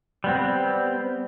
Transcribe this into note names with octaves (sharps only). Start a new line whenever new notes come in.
G3 B3 C4